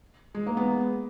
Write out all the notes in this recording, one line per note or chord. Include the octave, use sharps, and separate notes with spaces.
G#3
A#3
B3